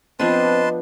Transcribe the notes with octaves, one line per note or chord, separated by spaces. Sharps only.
F3 B3 C4 D4 B4 D#5 A5 C6